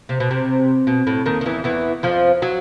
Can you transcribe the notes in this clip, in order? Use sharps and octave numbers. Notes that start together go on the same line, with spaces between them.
C3
B2
C3
B2
A2
D#2 D#3
D#3
E2 E3
E2 E3
F2 F3
F#3